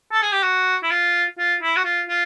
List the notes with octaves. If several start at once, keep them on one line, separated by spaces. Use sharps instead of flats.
A4
G#4
G4
F#4
E4
F4
F4
E4
F#4
F4
F4